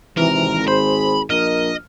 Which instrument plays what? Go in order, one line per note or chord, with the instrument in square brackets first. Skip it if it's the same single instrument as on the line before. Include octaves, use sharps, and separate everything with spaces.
[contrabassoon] G#1 [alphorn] C3 [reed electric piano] E3 [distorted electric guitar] A#4
[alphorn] G#4 [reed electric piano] C5 [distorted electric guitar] B5
[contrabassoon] A#1 [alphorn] A#4 [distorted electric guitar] D#5 [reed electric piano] F6